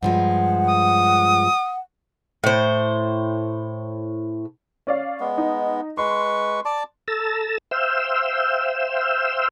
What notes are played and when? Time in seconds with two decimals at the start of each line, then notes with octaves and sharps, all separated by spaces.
0.03 G2 F3 G#3 F#5
0.68 D#6
2.44 A2 C5
4.87 C#4 D5 F5
5.20 G#3 B3
5.38 D#4
5.97 G#3 B4 C6 C#6
6.65 D5 A5 D6
7.08 A4 A5 A#5 E6
7.71 C5 E5 F5 G5 E6